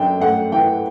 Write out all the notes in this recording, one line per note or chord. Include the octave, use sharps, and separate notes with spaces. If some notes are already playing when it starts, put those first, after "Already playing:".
Already playing: F#2 D4 G5
A3 F#5
E3 G5